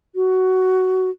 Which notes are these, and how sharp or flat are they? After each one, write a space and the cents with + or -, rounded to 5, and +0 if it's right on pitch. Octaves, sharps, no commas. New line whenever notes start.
F#4 +10